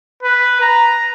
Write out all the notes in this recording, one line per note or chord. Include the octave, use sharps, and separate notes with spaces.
B4
A#5